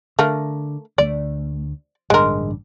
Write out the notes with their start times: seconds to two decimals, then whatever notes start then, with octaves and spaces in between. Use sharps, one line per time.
0.19 D3 A3 A#4 F5
0.98 D2 G3 A3 D5
2.10 A1 G2 D3 G#3 A#4